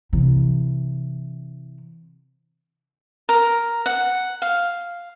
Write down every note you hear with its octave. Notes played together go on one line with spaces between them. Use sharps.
C3 E3
A#4
F#5
F5